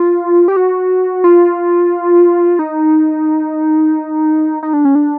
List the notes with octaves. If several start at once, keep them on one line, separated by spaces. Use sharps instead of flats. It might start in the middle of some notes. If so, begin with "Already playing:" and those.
Already playing: F4
G4
F#4
F4
D#4
D#4
D4
C#4
D4